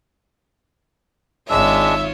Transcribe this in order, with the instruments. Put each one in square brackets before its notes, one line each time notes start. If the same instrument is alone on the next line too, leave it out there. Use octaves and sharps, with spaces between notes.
[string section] G#1 E5 [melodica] G#3 D4 [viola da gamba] D#4 F4 C#5 [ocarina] E6